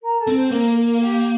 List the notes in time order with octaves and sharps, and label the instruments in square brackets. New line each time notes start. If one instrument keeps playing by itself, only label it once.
[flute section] A#4 A#5
A4 A5
[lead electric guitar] C4
[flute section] C5
[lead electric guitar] A#3 [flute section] A#4
[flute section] A#4
G4